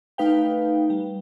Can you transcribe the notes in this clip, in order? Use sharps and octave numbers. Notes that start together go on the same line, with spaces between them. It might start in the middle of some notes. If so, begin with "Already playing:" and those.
A3 D#4 B4 F5 G5
G3